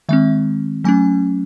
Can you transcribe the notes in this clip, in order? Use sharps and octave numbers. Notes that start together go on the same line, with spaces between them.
D#3 G#3 C4 E5
F#3 A3 C#4 G#5